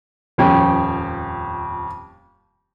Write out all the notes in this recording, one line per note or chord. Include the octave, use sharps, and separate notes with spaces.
D#1 F2 C#4 G5